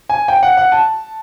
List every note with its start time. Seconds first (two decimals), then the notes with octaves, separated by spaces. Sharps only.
0.09 G#5
0.28 G5
0.43 F#5
0.57 F#5
0.72 A5